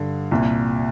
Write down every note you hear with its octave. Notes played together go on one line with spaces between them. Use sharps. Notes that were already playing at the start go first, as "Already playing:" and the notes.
Already playing: G2 D3
C2 A#2